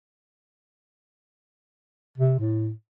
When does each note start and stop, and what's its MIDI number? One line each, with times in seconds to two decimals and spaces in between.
2.18 2.35 48
2.39 2.71 45